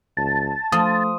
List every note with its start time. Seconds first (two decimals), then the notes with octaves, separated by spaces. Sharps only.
0.17 C#2 A5
0.72 F3 A3 D#6